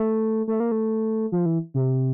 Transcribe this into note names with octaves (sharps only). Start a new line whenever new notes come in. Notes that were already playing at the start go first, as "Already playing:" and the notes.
Already playing: A3
A3
A#3
A3
F3
E3
C3